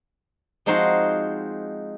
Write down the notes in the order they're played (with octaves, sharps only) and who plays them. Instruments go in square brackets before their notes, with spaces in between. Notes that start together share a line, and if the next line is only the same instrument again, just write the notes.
[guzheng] F3 G#3 C4 D#4 F#4 C5